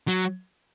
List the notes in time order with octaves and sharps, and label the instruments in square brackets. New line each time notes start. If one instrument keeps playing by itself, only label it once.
[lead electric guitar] F#3